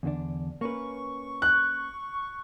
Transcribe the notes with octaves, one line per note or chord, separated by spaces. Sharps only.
E2 D3 D4
A#3 C#4 B4 C#6
F#6